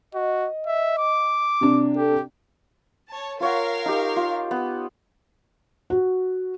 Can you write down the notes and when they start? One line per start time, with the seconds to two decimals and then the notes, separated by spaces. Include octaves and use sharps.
0.15 F#4 D#5
0.66 E5
0.98 D6
1.61 C3 D4
1.96 G4 A4
3.10 C#5 A5
3.40 F4 A#4 C#5 F5 F#5
3.86 D#4 G4
4.16 F4
4.51 B3
5.90 F#4